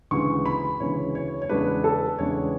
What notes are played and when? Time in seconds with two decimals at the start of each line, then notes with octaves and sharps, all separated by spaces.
0.11 D2 C#3 E3 G#3 C#6
0.46 B5
0.80 D2 C#3 E3 G#3 C#5
1.15 C#5
1.42 C#5
1.49 E2 C#3 G#3 D4 B4
1.84 A4
2.18 E2 C#3 G#3 D4 C#5